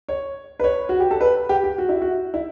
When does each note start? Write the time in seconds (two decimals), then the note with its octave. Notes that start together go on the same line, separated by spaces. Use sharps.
0.09 C#5
0.60 B4
0.64 C#5
0.89 F#4
1.00 G4
1.11 A4
1.21 B4
1.49 G4
1.64 G4
1.78 F#4
1.89 E4
2.02 F#4
2.34 E4